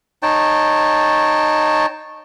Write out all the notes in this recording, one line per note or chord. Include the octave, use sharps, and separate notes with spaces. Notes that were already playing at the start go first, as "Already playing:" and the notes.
D#4 C#5 G5 A5